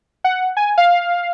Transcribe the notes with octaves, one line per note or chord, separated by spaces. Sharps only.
F#5
G#5
F5